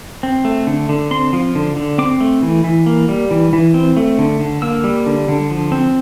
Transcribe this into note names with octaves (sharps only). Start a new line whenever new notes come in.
C4
A3
D3
D3
C4 C6
F3
D3
D3
C4 D6
A3
E3
E3
A#3
G3
E3
E3
C4
A3
D3
D3
A#3 E6
G3
D3
D3
F3
C4